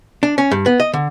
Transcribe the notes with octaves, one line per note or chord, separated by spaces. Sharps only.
D4
C#4
G2
B3
D#5
D3